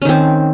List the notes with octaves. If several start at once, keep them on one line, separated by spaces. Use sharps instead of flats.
D#3 C4 C#4